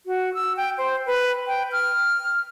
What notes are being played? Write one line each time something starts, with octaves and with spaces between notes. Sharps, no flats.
F#4
E6
G5
C5
B4
G5
F6